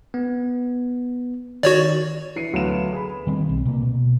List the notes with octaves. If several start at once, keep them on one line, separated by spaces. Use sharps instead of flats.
B3
D#3 F#4 C#5 D5
E3 C7 C#7 D#7
D2 F#3 B3 B4 F5 E7
G#4 B5
D#3 G3 C4
B1
C3 A#3
B2